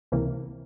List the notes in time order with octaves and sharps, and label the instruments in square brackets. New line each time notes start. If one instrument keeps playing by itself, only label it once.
[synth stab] C#2 C3 E3 A#3